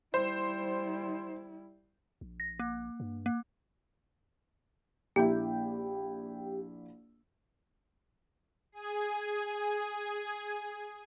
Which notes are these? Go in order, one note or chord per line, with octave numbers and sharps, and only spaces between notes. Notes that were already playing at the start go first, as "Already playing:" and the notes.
G3 E4 C5
A#1
A#6
A#3
G2
A#3
A#1 A#3 E4 G4 G5
G#4 G#5